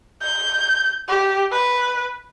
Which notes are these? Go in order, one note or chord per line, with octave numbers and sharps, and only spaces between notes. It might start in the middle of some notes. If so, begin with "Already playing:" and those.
G6
G4
B4